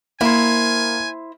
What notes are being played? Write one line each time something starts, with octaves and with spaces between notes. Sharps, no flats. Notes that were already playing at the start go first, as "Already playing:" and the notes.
A#3 E4 C5 G#5